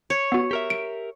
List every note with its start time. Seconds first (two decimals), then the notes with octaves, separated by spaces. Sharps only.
0.10 C#5
0.32 B3 F#4
0.51 G4 A#4 E5
0.70 D7